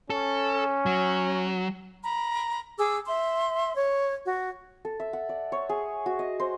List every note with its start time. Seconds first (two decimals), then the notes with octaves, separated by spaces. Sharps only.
0.10 C#4 A4
0.86 F#3
2.04 A#5 B5
2.78 G#4 D6 E6
3.07 E5 C6
3.75 C#5
4.24 F#4
4.85 A4
5.00 E5
5.13 F#5
5.29 D5
5.52 C#5
5.69 G#4
6.06 F#4
6.19 D#5
6.40 C5